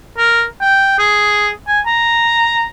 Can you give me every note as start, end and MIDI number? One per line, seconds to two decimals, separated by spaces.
0.18 0.44 70
0.61 0.99 79
0.99 1.50 68
1.67 1.80 80
1.87 2.69 82